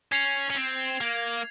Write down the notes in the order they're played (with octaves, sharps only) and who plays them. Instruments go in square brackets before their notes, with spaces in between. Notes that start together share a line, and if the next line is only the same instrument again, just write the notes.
[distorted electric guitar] C#4 [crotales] G#6 C7 F7
[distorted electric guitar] C#4
C4
A#3